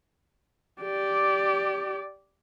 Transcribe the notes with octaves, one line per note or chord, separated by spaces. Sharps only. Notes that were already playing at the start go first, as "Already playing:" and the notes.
G4 D5